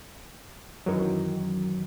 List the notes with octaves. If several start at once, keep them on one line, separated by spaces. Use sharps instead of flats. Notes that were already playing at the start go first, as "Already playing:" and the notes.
F#2 D#3 E3 F#3